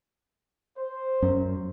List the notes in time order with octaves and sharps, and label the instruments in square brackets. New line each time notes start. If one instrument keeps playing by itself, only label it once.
[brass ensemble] C5
[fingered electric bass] F#2 C#4